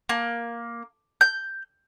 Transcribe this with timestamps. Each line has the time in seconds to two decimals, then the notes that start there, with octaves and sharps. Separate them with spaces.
0.09 A#3
1.21 G6